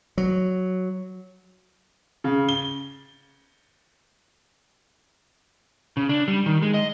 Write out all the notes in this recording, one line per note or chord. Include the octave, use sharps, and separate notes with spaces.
F#3
C#3
G7
C#3
D4
G3
D#3
G#3
D#5